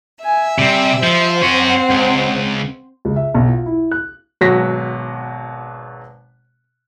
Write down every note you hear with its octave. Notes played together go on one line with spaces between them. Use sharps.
E5 G#5
C3 G3 C4
F3 C5
C4 C#4 F#4 F#5
C#2
C#2
E5
B1
F4
E4
F#6
G#1 B2 F#3 F#4 A#6 B6